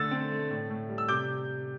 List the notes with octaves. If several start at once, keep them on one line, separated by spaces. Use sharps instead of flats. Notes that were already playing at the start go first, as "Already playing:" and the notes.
Already playing: D3 A3 E6 A6
C4
A3
A2
A2
G3
E6
C3 D6 G6